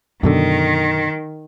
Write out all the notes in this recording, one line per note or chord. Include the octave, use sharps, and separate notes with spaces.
F#2 B2 D3 D#3